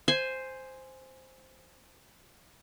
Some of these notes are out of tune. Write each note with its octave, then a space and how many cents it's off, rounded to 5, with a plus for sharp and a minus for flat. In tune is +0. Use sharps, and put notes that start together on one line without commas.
C5 +0 G#5 +0